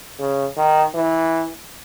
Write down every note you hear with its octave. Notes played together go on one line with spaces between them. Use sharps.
C#3
D#3
E3